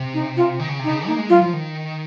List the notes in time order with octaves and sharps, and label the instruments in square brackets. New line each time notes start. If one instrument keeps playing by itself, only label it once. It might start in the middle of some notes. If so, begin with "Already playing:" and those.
Already playing: [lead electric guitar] C3
[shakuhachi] D#4
F4
[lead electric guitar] D#3
C#3
C3
[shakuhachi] D#4
[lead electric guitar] C#3
[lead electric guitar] A#3 [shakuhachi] D#4
[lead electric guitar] G#3
[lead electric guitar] F#3 [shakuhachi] F4
[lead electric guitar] F3
D#3